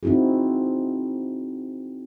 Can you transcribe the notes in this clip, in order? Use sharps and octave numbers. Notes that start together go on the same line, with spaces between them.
C4 D#4 E4 F#4 G#4